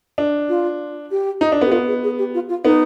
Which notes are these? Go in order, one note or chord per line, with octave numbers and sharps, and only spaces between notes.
D4
F4
G4
D#4
D4
B3
G4
B3 F4
G#4
G#4
G4
F4
F4
B3 D#4